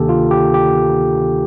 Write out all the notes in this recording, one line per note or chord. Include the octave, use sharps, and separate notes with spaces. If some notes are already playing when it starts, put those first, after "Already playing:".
Already playing: D2 C3 D#3 A#3 D4 G4 A4
F4
G4
G4